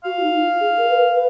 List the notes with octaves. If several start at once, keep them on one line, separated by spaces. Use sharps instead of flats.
F#4 F5
F4
D#4
F4
G#4
A#4
B4
A#4
B4